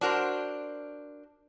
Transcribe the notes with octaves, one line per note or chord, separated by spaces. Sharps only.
D4 F#4 A#4 C5